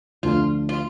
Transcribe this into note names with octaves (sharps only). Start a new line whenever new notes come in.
D2 D3 F3 A3 D4 F4
F4